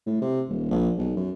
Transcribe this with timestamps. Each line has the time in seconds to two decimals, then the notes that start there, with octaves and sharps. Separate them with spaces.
0.06 A2
0.21 C3
0.49 D#1
0.71 A#1
0.98 B1
1.16 F#2